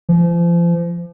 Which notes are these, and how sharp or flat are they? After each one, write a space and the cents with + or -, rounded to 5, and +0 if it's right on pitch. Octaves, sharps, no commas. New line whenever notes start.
F3 -35